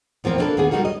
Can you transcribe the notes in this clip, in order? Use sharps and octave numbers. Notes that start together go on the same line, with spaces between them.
E2 F3 A#3 C4
A#3 D4 D#4 G#4 A4 B4
D#2 B3 G#4
G3 G#3 D#4 F#4 A#4
D#5